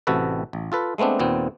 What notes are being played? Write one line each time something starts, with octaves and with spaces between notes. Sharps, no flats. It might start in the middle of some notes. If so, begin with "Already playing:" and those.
A1 C3 F#4 A4 B4
A1
F4 A4 B4
G#3 A3 B3 C4 D4
D#2 A#2 B3 C4